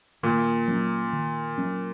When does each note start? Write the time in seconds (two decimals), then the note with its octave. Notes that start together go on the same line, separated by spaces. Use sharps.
0.23 A#2 D#3
0.68 F#3 C#4
1.13 D#3
1.58 F#3 C#4